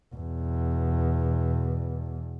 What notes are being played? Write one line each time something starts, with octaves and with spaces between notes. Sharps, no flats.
E2 B2